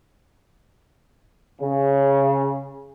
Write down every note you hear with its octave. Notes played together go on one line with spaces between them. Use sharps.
C#3